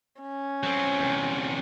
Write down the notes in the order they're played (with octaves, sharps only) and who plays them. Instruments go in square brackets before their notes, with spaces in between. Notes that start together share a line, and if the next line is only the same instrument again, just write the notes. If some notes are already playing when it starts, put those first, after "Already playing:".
[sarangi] C#4
[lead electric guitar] F#3 C4
E2 C3